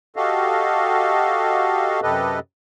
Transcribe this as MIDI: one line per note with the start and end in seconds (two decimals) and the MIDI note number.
0.16 2.00 66
0.16 2.00 67
0.16 2.00 69
0.16 2.00 75
0.16 2.00 77
2.03 2.39 42
2.03 2.39 48
2.03 2.39 67
2.03 2.39 69
2.03 2.39 71
2.03 2.39 75